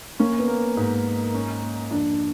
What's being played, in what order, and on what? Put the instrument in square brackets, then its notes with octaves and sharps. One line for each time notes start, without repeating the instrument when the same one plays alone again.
[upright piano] A#3 [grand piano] C#4
[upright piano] B3
[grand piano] A#3
G#2
A#3
C#4
A#3
[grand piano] F2 [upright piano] D4